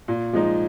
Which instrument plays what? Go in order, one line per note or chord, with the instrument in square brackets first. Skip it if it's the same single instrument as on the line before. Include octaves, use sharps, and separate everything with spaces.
[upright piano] A#2
F3 G#3 D#4